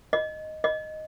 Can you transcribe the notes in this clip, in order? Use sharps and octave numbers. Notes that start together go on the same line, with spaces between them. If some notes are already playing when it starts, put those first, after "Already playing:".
D#5
D#5